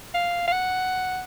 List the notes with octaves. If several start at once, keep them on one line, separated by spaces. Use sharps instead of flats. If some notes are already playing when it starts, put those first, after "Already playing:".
F5
F5
F#5